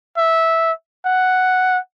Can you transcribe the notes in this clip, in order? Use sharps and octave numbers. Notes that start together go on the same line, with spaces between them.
E5
F#5